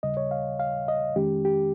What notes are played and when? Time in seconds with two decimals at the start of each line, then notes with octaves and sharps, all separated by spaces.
0.03 D#2 C#3 G3 D#5
0.17 C#5
0.31 F5
0.60 F5
0.88 D#5
1.16 F2 D#3 G#3 C#4 G4
1.45 G4